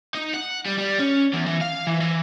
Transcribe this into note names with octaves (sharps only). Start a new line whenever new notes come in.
D#4
F#5
G3
G3
C#4
E2
E3
F5
E3
E3